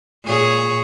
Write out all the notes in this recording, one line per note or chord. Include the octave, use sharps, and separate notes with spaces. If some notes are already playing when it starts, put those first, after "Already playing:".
A#2 G#4 C#5